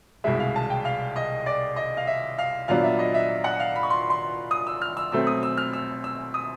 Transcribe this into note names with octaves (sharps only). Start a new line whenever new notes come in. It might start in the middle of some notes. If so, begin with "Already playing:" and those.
C2 B2 G#3 E5
F5
A5
G5
F5
D#5
D5
D#5
F5
E5
F5
A#2 F#3 B3 D4 F5
E5
D#5
E5
F#5
F5
B5
C#6
C6
C6
D#6
E6
F6
E6
B2 F#3 A3 C4 E6
D#6
E6
F6
E6
E6
D#6